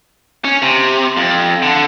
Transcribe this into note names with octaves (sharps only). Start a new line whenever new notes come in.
C#4
C3
F2
D3